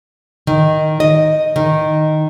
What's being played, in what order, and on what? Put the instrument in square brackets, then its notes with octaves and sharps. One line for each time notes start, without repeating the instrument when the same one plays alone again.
[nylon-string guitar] D#3
D#5
D#3